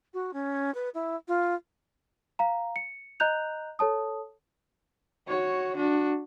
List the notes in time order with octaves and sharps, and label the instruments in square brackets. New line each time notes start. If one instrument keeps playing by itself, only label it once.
[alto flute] F#4
C#4
B4
E4
F4
[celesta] F5 A#5
C#7
D#5 A#5 F#6 G6 F7
A4 C#5 A5 D#6
[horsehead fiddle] F#4 C#5
D4 F#4